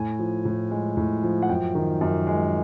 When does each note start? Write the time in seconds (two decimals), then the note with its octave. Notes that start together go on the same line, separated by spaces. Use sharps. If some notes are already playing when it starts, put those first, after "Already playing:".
Already playing: A2 G#5
0.19 F3
0.45 A2
0.71 G#3
0.97 A2
1.23 F3
1.42 F#5
1.49 F#2 G5
1.75 D#3
2.01 F#2
2.27 G#3